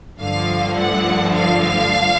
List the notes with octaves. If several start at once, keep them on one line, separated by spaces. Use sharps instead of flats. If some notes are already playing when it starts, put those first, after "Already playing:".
G2 D3 F3 A3 F5
F#5
F5